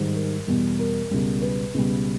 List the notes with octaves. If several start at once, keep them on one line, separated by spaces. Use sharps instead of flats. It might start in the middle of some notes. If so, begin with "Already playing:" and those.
Already playing: G#2 D#3 G3
A#4
E2 B2 G3
A#4
C#2 B2 G3
B4
C#2 B2 G3